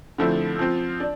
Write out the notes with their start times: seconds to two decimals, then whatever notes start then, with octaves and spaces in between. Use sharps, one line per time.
0.18 D3 F3 A3 C4 E4
0.59 F3 C4 F4
1.00 D4